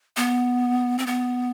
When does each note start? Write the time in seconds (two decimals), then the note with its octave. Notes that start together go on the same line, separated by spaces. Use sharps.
0.17 B3
0.99 C4
1.06 B3